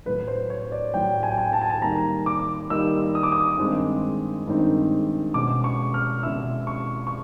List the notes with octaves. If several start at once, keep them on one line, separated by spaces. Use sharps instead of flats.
A2 F#3 A3 B4
C5
C#5
D5
A2 F#3 A3 G5
G#5
G5
G#5
A5
G#5
A5
D#3 G3 A#3 D#4 A#5
D6
D#3 G3 A#3 D#4 E6
D#6
D6
D#6
G2 D#3 G#3 C4 D#4
G2 D#3 G#3 C4 D#4
B2 G#3 C#4 E4 D6
C#6
F6
B2 G#3 C#4 E4 E6
C#6
C#6